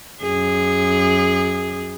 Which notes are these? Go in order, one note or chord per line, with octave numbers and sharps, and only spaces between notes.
F#2 G#4